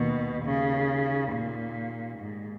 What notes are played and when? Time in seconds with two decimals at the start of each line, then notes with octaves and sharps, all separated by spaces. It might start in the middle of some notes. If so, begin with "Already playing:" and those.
Already playing: D#2 B2 D#3 A#3 D#4
0.45 C#3
1.32 A#2
2.18 G#2